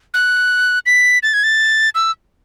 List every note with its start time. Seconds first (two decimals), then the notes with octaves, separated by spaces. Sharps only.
0.14 F#6
0.86 B6
1.23 A6
1.34 G#6
1.44 A6
1.95 E6